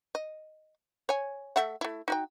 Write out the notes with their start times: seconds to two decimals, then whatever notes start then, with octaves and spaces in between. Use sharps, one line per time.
0.15 D#5
1.09 C#5 G#5
1.56 A3 E5 F#5
1.81 A3 E4
2.08 D#4 F#4 G5